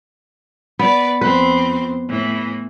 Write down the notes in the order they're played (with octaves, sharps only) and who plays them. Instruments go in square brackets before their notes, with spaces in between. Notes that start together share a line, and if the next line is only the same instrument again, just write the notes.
[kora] B3 [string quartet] B4 D5
[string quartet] F2 C4 C5 [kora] B4
[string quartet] A2 E3